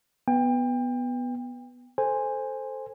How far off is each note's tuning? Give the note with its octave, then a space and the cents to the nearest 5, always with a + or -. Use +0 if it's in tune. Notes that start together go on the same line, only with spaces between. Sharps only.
B3 +0 G5 +30
A4 +0 C5 +0 G#5 -10